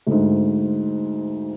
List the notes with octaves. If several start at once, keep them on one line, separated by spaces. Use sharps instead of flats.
D2 G#2